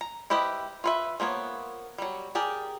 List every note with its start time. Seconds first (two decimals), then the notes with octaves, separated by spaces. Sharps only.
0.01 A#5
0.30 E4 G4 B4 C5 D#5
0.84 F4 B4 E5
1.20 F3 A#3 B3 C#5
1.98 F#3 G3
2.35 G4 G#4 A#4 D5